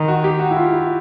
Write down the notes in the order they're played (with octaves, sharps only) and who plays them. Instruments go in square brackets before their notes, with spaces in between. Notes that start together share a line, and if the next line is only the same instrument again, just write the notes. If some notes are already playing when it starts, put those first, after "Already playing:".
Already playing: [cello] D#3
[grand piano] F#4
G4
F#4
E4
F4
E4